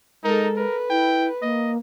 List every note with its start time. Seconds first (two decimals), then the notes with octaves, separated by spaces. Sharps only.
0.24 G#3 D#4 A4 A#4
0.56 A#4 B4
0.90 E4 G5
1.42 A#3 D#5